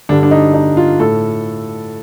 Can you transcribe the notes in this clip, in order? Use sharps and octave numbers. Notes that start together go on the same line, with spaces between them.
G2 D3 D4
D4
D#4
D#4
F4
A2 A4